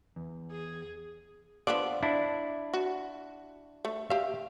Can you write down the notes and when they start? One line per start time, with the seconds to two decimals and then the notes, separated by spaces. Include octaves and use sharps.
0.16 E2
0.52 G#4
1.67 D3 F3 B3 D5
2.03 D4 E4
2.74 F#4
3.85 A3
4.10 G4 E5 F5